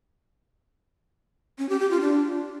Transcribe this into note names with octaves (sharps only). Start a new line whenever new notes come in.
C#4
G4
G4
F4
D4